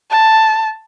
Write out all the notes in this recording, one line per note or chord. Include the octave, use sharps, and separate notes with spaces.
A5